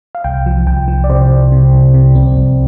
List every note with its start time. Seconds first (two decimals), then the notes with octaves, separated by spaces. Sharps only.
0.15 F5
0.24 C2 G5
0.46 F3
0.67 C2 G5
0.88 F3
1.04 D5
1.10 C3 C5
1.31 C2
1.52 C3
1.73 C2
1.94 C3
2.15 C2 C4
2.37 C2